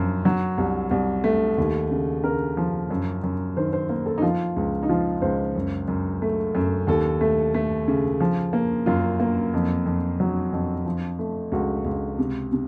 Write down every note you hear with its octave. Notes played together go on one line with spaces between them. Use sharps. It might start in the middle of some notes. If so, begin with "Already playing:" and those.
Already playing: F#2 F3
F#3
C2
C2
A3
D#2
C#3
C#3 A#4
F3
F#2
F#2
D#3 C5
C5
A#3
A4
D#4
F3 F4
C#2
D#4
F3 F4
C#2 C5
F#2
F#2
A3
F#2
D#2 A4
A3
A3
C#3
F3
A#3
F#2 F4
A#3
F2
F2
F#3
F2
F3
A3
C#2 F#4
C#2
C3
C3